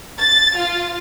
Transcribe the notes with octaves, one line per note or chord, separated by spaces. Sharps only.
A6
F4